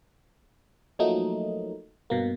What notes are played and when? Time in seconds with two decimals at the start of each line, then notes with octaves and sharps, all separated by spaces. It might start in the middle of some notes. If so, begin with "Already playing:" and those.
0.99 F3 F#3 A3 A#3 D#4
2.10 G2 B2 A#3